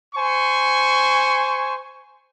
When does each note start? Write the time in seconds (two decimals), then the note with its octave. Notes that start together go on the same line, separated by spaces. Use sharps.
0.15 C5 G#5 C#6